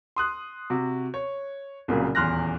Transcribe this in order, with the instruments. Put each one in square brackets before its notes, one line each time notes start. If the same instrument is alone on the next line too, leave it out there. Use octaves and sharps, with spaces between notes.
[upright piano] C6 D#6 F#6
C3 F#4
C#5
C2 A#2 C#3 F#3 A#3
D#1 E2 C6 F6 F#6 A#6